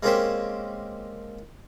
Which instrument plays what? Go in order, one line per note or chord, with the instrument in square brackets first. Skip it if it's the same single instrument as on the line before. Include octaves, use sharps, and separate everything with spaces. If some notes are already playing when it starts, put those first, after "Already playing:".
[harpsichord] G#3 A#3 C4 C#4 G4 C5